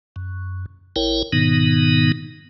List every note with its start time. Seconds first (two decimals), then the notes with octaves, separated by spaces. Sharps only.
0.16 F#2
0.96 A1 E4 A#4 C#5 G5
1.33 G#2 B2 D#3 B3 D#4